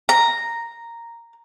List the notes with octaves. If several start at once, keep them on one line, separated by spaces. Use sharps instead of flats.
A#5